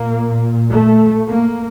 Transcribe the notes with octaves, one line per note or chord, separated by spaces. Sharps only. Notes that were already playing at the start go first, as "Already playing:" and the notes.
Already playing: A#2 A#3
A3
A#3